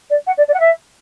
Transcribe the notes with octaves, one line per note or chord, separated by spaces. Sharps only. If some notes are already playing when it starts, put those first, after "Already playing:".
D5
F#5
D5
D5
F#5
E5